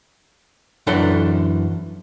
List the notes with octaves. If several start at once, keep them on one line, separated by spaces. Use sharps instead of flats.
F#2 E3 D4 A4 F#5 C6